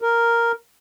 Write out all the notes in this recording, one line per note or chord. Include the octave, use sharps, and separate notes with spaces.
A#4